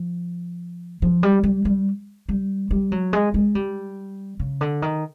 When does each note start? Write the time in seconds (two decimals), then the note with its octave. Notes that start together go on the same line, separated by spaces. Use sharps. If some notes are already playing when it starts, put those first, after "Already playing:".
Already playing: F3
1.02 F3
1.23 G3
1.43 G3
1.65 G3
2.29 G3
2.71 G3
2.92 F#3
3.13 G#3
3.34 G#3
3.55 G3
4.39 C#3
4.61 D3
4.82 D#3